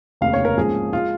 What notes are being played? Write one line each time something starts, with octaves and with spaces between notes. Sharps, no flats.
F1 D#2 C#3 F5
C#5
A#4
G#2 F3 A#3 C#4 G#4
G#3 F4